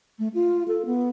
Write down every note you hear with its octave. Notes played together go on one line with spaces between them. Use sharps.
A3
F4
A4
B3